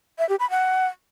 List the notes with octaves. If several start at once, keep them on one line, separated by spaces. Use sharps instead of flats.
E5
G4
B5
F#5